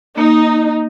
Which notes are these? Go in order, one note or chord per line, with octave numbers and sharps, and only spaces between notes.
A#3 D#4